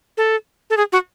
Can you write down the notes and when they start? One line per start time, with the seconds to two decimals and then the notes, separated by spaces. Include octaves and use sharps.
0.17 A4
0.70 A4
0.77 G#4
0.92 F#4